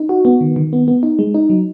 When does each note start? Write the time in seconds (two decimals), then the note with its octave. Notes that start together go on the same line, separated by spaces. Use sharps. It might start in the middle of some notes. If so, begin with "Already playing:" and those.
Already playing: D#4
0.09 F#4
0.25 B3
0.41 D#3
0.56 D#3
0.73 B3
0.88 B3
1.03 D#4
1.19 G#3
1.34 D#4
1.50 F#3